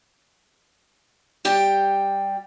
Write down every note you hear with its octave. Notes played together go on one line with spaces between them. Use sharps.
G3 G4 G5